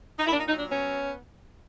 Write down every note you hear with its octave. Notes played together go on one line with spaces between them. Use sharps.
D#4
A#2 E4
D4
D#4
F#3 D#4
D4
B3 C#4